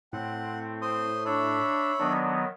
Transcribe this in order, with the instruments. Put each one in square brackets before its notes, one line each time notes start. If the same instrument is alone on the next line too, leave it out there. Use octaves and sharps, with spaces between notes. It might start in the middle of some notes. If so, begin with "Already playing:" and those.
[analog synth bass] A2 [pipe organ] C4 [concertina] F#5
[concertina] C5 C6 D#6
[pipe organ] D4 [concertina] C#5 E5 B5
[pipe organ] D#3 F#3 B3 [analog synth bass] D4